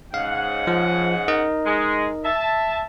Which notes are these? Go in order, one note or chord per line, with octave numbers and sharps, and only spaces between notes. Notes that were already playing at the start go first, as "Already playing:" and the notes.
G#2 C#3 F5 F#5
F3
D#4 A#4 D#5
G#3
E5 A5